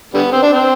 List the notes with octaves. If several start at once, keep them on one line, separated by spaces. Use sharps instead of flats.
D3 G3 B3
C4
D4
C4